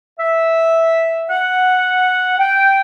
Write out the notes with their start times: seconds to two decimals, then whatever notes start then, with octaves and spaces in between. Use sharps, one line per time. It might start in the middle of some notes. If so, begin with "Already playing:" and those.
0.19 E5
1.29 F#5
2.39 G5